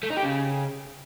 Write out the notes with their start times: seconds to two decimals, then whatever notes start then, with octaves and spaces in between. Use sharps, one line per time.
0.03 A3
0.10 D#4
0.17 G4
0.24 C#3